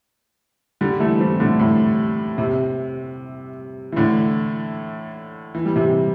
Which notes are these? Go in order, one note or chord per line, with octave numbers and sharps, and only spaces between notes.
D3 G3
E3 A3
G3 C4
A2 D3
A2
C3
E3
A2 D3
E3
G3
C3 E3